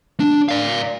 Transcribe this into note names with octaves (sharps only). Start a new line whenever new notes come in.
D4
D5 F5